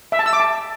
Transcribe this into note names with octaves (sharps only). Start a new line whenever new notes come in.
E5
A5
E6
D6
A5